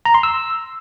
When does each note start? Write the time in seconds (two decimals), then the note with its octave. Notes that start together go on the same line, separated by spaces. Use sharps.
0.05 A#5
0.14 C6
0.23 E6